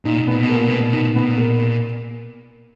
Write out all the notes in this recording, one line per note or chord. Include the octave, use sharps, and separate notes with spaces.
A#2 D#4
B2
A#2 B3
B2
A#4
A#2
B2 B3
A#2
B2 D#4
A#2
B2 B3
A#2
A#4